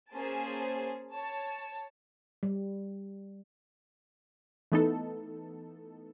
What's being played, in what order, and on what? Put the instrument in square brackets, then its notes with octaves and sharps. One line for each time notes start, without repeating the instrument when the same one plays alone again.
[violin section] A#3 C#4 G#4 C5 A5
C#5 A5
[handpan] G3
[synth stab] E3 A3 B3 D#4 A4